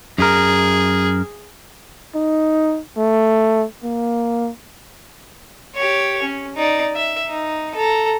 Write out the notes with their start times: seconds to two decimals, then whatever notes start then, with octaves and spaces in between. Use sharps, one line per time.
0.18 F#2 G#4 A#4
2.15 D#4
2.97 A3
3.84 A#3
5.75 G4 C#5
6.23 C#4
6.56 D#4 D5
6.95 E5
7.28 D#4
7.76 A4 A#5